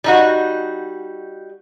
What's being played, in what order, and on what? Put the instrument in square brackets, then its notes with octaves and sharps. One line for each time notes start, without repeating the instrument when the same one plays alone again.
[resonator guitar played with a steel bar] G3 D#4 F#4